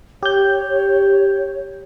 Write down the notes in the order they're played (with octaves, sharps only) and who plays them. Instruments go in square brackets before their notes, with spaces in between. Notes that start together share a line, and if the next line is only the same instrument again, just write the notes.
[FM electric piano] G4 G6 [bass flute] C#5